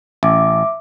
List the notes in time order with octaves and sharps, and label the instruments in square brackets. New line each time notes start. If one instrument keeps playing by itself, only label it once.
[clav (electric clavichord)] A1 [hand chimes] E5 D6